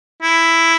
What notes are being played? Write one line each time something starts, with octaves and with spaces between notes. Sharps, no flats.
E4